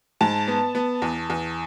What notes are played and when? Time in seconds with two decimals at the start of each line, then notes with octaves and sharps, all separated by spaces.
0.21 G#2 A5
0.48 B3
0.75 B3
1.02 E2
1.30 E2